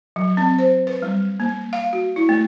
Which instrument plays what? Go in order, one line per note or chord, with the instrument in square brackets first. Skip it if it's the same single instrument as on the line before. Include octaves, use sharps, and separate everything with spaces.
[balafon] F#3
C4
C5
B4
G3
A#3
F5
F#4
E4
A3